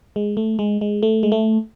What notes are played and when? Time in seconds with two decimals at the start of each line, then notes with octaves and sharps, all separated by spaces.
0.16 G#3
0.37 A3
0.59 G#3
0.81 G#3
1.03 A3
1.23 G#3
1.32 A3